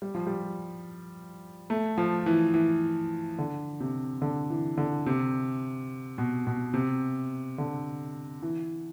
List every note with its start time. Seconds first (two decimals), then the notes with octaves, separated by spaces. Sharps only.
0.02 G3
0.15 F3
0.27 G3
1.70 A3
1.98 F3
2.26 E3
2.54 E3
3.39 D3
3.80 C3
4.22 D3
4.50 E3
4.78 D3
5.06 C3
6.18 B2
6.47 B2
6.74 C3
7.58 D3
8.42 E3